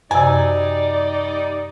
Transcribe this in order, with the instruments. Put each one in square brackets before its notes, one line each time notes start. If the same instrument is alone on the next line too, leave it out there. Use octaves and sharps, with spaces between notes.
[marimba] F#2 C3 [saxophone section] G3 D#4 [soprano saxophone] D5 [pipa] G#5